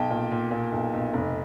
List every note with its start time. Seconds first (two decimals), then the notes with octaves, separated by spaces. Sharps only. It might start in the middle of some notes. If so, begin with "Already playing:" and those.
Already playing: B1 G5 A5
0.10 A#2
0.31 A#2
0.51 A#2
0.72 B1
0.93 B1
1.13 F1